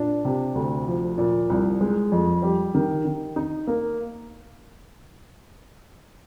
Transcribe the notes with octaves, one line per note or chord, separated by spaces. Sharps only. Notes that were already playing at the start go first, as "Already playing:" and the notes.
Already playing: A#2 D4
C3
D2
F3
A#2
C2
G#3
F2
G3
D#3
D#3
D#4
A#3